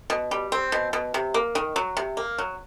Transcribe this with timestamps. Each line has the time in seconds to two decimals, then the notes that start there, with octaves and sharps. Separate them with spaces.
0.10 B2
0.31 G3
0.52 C4
0.72 B2
0.93 B2
1.14 C3
1.34 A#3
1.55 D#3
1.76 F#3
1.97 C3
2.17 A#3
2.38 F#3